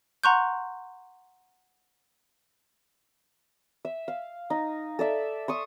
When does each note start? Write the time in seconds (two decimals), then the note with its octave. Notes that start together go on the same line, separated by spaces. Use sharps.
0.24 F#5 A#5 C6 C#6 F#6 G6
3.85 E5
4.08 F5
4.50 D#4
4.99 A4 D5 E5
5.48 C6 C#6 D#6